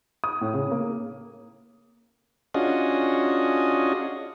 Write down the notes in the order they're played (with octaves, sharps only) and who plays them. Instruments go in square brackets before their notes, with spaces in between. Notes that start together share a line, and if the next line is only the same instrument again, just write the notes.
[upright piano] D#6
A2
C#3
A#3
[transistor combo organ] C#4 D4 F4 F#4 G#4 D#5